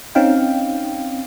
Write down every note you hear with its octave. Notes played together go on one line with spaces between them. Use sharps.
C4 C#4 D#4 F5 G5